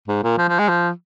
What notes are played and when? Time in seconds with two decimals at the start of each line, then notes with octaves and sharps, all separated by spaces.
0.08 G#2
0.23 A#2
0.38 F3
0.49 F3
0.59 G#3
0.69 F3